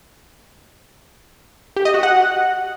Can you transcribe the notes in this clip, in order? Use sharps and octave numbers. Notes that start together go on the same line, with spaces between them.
G4
D#5
F#4
F#5